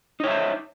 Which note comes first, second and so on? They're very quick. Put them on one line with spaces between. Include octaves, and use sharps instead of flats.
D#4 C#5 E5 C5